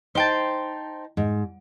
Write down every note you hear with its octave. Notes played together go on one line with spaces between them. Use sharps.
D#4 C5 G5 A5
G#2